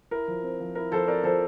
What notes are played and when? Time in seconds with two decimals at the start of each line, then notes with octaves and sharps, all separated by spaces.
0.11 E4 A#4
0.28 F3
0.43 C4
0.60 F3
0.75 E4 A#4
0.91 F3 A4 C5
1.08 C4 A#4 D5
1.24 F3 A4 C5